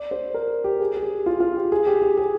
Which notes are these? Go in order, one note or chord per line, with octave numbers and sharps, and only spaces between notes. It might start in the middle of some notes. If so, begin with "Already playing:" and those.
Already playing: D5
C5
A#4
G4
G#4
G#4
G4
F4
F4
G4
G#4
G4
G4
G#4